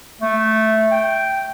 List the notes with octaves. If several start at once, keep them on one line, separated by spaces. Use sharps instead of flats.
A3
G5